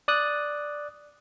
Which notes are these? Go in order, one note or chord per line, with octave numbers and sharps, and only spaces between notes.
D5 D#6 F#6